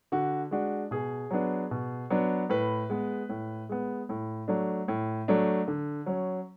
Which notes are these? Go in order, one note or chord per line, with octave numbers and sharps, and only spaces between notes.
D3 F#4
G#3 D4 F#4
B2 G#4
F#3 B3 D4
B2
F#3 B3 D4
A2 B4
G#3 B3
A2
G#3 B3
A2
F#3 A3 D4
A2
F#3 A3 D4
D3
F#3 C#4